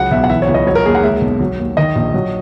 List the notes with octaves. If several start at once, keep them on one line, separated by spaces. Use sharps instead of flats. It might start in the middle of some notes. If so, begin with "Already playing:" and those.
Already playing: C#2 F#3 F#5
B1 E5
F#5
E3 E5
C#5
C#2
D#5
F#3 C#5
A#4
D#2 G#4
F#5
G#3 E5
B1
F#3
D#2
D#3 D#5
A#1
F#3